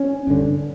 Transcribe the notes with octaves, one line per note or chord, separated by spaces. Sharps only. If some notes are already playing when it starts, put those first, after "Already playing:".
Already playing: C#4
G2 D3